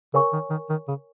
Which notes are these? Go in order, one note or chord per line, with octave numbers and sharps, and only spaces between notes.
C#3 A#4 C#5 G#5 C#6
D#3
D#3
D#3
C#3